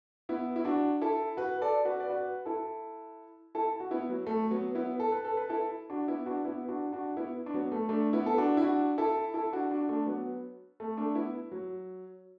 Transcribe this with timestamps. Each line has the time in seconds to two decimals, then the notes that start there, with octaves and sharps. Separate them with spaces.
0.29 B3 E4
0.56 E4
0.65 D4 F#4
1.02 E4 A4
1.37 F#4 B4
1.61 A4 D5
1.85 F#4 B4
2.00 D5
2.10 F#4 B4
2.45 E4 A4
3.55 E4 A4
3.80 F#4
3.91 B3 E4
4.09 F#3
4.27 A3
4.51 F#3 B3
4.75 B3 E4
5.00 A4
5.12 B4
5.25 A4
5.37 B4
5.49 E4 A4
5.90 D4 F#4
6.08 B3 E4
6.26 D4 F#4
6.45 B3 E4
6.69 D4 F#4
6.92 D4 F#4
7.17 B3 E4
7.46 D4
7.54 F#3 B3
7.72 A3
7.89 A3 D4
8.13 B3 E4
8.26 A4
8.38 D4 F#4
8.57 E4
8.62 D4 F#4
8.98 E4 A4
9.34 E4 A4
9.53 D4 F#4
9.71 D4 F#4
9.89 A3 D4
10.06 F#3 B3
10.80 A3
10.97 A3 D4
11.15 B3 E4
11.52 F#3